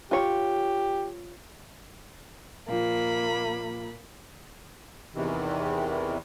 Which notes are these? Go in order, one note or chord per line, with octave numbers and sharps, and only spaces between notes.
F4 G4 C#5
A#2 F3 A#3 B5
E2 C3 D#3 E3